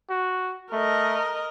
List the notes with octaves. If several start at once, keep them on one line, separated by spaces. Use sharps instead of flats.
F#4
A3 A#4 D#5